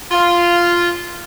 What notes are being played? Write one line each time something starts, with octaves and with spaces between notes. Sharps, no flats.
F4